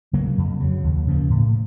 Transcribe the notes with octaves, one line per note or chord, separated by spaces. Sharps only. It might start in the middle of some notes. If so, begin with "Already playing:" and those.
C#3 F#3 A#3
F2
C#3 F#3
D#2
C#3 F3 A#3
A2